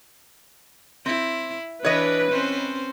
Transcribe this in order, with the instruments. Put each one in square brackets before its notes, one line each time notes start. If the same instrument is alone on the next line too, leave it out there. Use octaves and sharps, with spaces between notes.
[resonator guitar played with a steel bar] C4 [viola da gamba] E4
[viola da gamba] E3 D4 [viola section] B4 [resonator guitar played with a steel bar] C#5 D#5
[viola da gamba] C4 C#4 C5